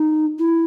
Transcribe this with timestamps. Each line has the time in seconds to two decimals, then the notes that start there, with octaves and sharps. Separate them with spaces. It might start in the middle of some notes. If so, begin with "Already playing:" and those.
Already playing: D#4
0.39 E4